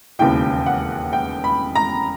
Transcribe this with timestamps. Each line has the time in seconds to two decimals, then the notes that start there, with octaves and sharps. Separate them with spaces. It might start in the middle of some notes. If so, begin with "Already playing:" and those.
0.19 E1 D#2 C#3 E3 G5
0.66 F#5
1.13 G5
1.44 B5
1.75 A#5